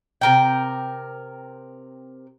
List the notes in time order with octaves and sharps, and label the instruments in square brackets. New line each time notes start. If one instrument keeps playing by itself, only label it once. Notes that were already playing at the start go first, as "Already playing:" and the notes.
[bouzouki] C3 A#4 G5